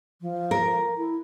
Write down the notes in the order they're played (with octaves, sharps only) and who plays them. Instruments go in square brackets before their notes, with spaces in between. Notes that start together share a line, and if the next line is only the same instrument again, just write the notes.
[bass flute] F3
[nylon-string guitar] A#4
[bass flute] E4